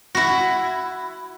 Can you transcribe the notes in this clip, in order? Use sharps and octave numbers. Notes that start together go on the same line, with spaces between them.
E4 F#4